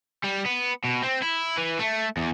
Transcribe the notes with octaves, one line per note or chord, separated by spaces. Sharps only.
G3
B3
B2
C4
E4
E3
A3
E2